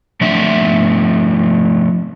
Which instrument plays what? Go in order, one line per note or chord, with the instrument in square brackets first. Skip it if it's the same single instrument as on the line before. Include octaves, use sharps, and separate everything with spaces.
[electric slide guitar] F3 A3 D4 E5